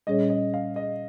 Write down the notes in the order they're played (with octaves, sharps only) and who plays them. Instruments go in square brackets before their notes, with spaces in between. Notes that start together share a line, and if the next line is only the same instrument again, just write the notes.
[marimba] A#2 G3 C#4 G#4 C#5 [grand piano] D#5
[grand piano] D#5
F5
D#5